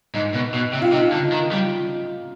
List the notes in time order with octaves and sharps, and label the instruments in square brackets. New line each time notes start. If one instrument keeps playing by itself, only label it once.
[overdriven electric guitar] G#2 [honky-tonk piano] D#4
[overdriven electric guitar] B2
B2
C3
[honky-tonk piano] F4
[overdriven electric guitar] C3 [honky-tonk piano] D#4
[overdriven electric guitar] D3
D#3
G3